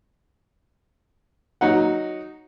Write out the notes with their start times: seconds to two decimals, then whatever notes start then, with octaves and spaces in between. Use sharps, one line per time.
1.61 F#3 D#4 F#5